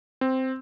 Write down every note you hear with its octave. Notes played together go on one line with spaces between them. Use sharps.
C4